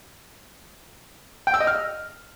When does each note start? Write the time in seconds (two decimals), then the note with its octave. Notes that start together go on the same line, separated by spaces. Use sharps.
1.47 G5
1.54 E6
1.60 D#5
1.67 F6